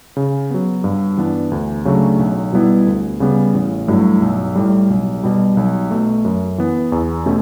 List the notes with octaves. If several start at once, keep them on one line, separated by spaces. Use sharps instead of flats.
C#3
F#3 B3
G2
E3 B3 D4
D2
C#3 F#3 A3 D4
B1
B2 G3 B3 E4
D2
C#3 G3 B3
A1
G2 F#3 A3 E4
B1
A2 G3
B1
B2 G3
B1
B2 A3
F#2
E3 B3
E2
B2 A3 C#4 G4